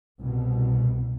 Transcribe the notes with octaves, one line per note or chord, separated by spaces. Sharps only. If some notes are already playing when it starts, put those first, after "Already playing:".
C2 B2